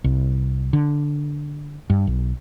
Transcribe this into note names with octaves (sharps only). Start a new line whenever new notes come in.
C2
D3
G2
B1